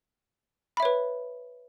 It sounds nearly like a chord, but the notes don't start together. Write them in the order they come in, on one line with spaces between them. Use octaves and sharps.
B5 E5 C#5 B4